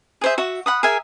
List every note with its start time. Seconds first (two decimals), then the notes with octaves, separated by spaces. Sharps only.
0.21 G#4 C5 E5
0.38 F#4 E5
0.66 F#5 B5 D#6
0.83 G#4 A#4 E5 G#5